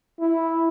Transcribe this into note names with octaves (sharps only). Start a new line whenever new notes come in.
E4